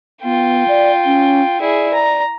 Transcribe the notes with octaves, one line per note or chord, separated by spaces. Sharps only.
B3 F4 G5
D5
C#4
E4 G#4 D5
A#5